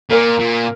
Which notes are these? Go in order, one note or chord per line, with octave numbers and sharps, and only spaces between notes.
A#2 A#4
A#2